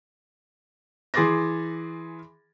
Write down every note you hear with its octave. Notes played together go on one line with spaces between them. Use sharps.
E3 G#4 C6 D6 A6 A#6